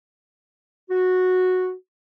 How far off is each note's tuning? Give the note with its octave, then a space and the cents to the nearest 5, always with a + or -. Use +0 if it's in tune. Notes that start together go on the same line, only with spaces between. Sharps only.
F#4 -10